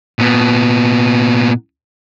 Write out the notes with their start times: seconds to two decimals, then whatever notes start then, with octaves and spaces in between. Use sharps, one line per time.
0.19 A#2 B3